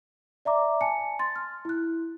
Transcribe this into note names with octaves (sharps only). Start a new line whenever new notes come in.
D5 E5 A#5 D6
G#5 A5 C#7
C6 A6
F6
E4 F#6